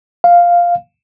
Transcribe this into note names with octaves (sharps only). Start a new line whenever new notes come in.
F5